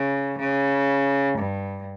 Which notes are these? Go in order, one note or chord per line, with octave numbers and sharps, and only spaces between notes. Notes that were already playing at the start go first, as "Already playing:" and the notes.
Already playing: C#3
C#3
G2